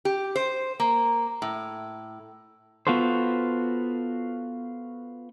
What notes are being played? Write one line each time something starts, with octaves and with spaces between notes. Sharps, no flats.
G4
C5
A#3
A2
B3 F4 F#4 A4 C5